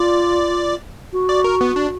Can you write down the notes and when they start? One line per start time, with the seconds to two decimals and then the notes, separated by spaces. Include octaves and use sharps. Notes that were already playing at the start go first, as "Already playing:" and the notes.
Already playing: F4 D5
1.13 F#4
1.29 D5
1.44 A#4
1.61 B3
1.76 D4